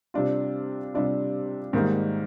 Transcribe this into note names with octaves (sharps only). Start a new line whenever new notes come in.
C3 G3 D4 F4
C3 G3 D4 F4
G#2 D#3 G3 A#3 D#4